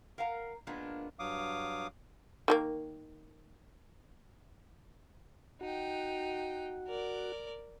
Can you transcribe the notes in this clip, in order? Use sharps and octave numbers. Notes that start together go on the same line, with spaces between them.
A#4 F5 F#5 A#5
A#2 G#3 A#3 B3 D4
G2 F#3 F5 D6 D#6
D#3 G#3 A#3
D#4 F#4 G5
A#4 D5